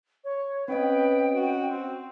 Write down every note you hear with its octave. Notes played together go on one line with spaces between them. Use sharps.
C#5
C4 C#4 B4 D#5 G5
F#4
C4